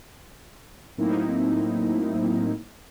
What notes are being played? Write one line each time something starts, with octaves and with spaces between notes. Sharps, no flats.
A2 F#3 A#3 C4 D#4 E4